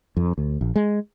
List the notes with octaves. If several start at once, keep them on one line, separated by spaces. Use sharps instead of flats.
F2
D2
A#1
G#3